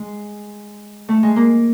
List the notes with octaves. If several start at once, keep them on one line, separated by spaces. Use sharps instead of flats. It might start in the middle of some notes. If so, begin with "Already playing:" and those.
Already playing: G#3
A3
G#3
A#3